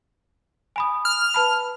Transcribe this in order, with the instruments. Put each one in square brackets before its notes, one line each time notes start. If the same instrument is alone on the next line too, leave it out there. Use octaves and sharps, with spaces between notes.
[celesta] G#5 B5 D#6
[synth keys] F6
[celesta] B4 A5 B5